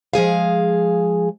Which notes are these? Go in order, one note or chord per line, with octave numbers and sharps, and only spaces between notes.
F3 G#3 G#4 F5